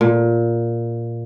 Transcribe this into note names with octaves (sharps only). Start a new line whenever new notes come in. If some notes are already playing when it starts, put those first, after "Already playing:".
A#2